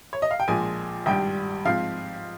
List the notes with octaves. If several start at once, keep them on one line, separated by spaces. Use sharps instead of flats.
C#5
D#5
F5
G5
A#1 A#2 F3 G#3 G#5
G#1 G2 G3 G5
G#2 F3 C4 F5